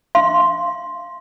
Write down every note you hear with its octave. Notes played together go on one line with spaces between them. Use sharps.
F5 C6